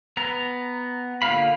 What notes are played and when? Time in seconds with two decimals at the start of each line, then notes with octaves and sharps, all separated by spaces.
0.17 B3 A#5
1.22 D3 A#3 F4 F5 B5